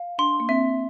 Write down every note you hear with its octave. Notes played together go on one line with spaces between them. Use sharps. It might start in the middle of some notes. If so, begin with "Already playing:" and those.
Already playing: F5
D4 C6
A#3
C4 E5